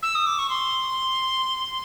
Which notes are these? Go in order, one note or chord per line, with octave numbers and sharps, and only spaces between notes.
E6
D#6
D6
C#6
C6